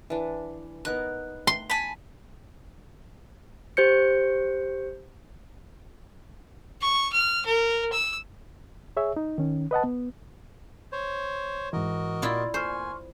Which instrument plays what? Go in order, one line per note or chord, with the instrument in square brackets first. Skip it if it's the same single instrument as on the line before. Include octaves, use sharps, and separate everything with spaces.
[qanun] E3 D4
[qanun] B3 D#4 A#4 [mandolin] F#6
[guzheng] C6
[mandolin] G#5 A5 B5
[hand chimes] G4 C5 G6 C#7
[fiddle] C#6
F6
A#4
E6
[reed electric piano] G#4 C#5 E5
D#4
D#3 C#4
B4 D#5 F#5 A5
B3
[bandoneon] C5 C#5
[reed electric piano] G#2 E3 [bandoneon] F#4 A#4 D#5
[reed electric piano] A#2 C6 A6 [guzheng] E4 F4 D5
[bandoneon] A#2 G#5 [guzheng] C5 [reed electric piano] C6 C#6 F6